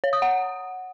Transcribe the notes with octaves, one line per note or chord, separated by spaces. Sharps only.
C#5
D#6
F#5